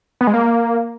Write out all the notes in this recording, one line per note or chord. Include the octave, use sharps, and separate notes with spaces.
B3
G#3
A#3